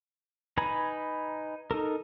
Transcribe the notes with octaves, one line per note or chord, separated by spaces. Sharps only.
D#4 B4 G#5 A#5 B5
D#4 A4 A#4